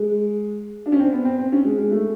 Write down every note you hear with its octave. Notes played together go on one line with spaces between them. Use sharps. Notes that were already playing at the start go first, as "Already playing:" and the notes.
Already playing: G#3
D4
C#4
C4
B3
C4
C4
C#4
G#3
G#3
A3